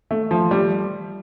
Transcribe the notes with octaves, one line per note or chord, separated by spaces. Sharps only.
A3
F3
G3